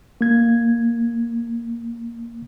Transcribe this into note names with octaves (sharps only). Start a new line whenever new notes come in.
A#3 G#6